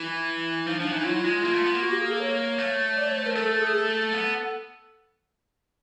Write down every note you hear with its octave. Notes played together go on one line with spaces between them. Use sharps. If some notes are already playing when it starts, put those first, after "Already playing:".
Already playing: E3 E4
F3 D#4
F3 D4
E3 D#4
F#3 F4
E4
G#3 F4
A#3
A3
B3
A#3
F#4
G4
G#4
A4
C#5
A3
D5
C#5
C5
A#4
A3 A4
A4
G#4
A4
B3